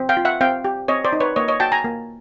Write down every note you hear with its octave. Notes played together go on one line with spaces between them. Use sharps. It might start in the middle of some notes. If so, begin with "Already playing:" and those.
Already playing: C4
F5 G5
F4
E5 F#5
C4 F5 G5
G4
C4 C#5 D#5
C5 D5
D#4
B4 C#5
A#3 C#5 D#5
C#5 D#5
F#4 G5 A5
G#5 A#5
A#3